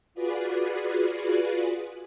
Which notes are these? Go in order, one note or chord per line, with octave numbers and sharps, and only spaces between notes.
F4 F#4 G#4 B4 D5